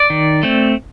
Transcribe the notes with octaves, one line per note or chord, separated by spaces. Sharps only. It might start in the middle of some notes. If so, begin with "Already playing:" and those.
Already playing: D5
D#3
A3 C4